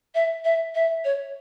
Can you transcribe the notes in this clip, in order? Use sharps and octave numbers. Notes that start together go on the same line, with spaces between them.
E5
E5
E5
C#5